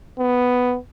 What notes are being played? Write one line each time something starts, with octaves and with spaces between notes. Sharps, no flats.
B3